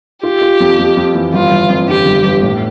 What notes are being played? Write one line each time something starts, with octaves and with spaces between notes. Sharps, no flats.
F4 G4
F4
F2
F2
F2
E3
G1 F4
G1
F2
D3 G4
G1
G1
A2